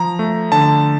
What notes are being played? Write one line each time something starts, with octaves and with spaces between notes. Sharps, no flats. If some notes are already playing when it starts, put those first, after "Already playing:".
Already playing: F3 A#5
A3
D3 A5